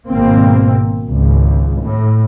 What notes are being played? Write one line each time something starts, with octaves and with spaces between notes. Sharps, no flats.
G#1 B2 A#3 C4
G#1 C#2
A2